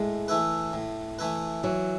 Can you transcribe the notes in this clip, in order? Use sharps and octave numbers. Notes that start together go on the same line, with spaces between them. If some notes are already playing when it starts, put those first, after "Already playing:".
Already playing: A2 G#3
E3 A3 E4 B4
A2
E3 A3 E4 B4
E3 F#3